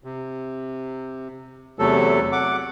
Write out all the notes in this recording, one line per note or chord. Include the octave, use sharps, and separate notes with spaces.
C3
E2 C3 F#3 A3 A4
F#5 D6